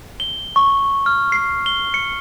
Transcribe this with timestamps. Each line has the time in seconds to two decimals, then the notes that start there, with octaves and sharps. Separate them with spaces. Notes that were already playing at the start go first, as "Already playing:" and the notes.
0.20 G7
0.56 C#6
1.06 F6
1.32 C7
1.66 G7
1.94 C#7